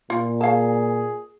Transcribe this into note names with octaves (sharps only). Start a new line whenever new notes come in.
A#2 F4
G#4 F5 A5